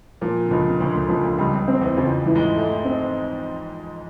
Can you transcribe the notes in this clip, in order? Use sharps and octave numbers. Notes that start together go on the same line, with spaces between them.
A#2 F3
D3
C#2 C#3 F3
C#3
D2 D3 F3
D2 D3
C#2 C#3 F3
D2 D3
C#2 C#3 G3
C#2 C#3
C4
E2 E3
F2 C#3 F3
E3
G#2 G#3
A3
C4